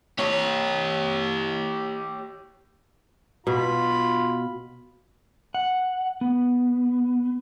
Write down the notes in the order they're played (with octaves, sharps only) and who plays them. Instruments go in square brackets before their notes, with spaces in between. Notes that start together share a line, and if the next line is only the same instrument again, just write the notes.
[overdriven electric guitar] G4 C#5
[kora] B2 [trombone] F4 [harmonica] B5
[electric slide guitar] F#5
B3